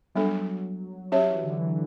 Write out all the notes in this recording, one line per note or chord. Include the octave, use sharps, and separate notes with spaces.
F#3 G3 B3 D4 A4
F#3 C#4 G4 C#5 E5
E3
D3
E3